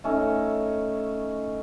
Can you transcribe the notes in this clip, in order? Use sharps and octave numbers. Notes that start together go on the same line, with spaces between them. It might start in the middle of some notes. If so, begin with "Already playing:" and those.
A3 C#4 D#4